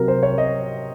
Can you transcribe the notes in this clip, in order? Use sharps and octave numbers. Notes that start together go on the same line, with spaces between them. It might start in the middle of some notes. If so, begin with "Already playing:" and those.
Already playing: C3 F#3 A#4
C5
C#5
D#5